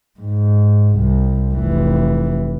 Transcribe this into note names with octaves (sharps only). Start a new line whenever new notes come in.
G#2
C2
F1 E3